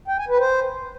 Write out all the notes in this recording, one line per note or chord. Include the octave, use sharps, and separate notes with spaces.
G5
G#5
B4
C5